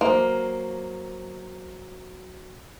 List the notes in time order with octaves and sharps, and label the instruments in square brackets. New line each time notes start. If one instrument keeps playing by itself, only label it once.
[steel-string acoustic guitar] F#3 C5 [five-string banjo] A#3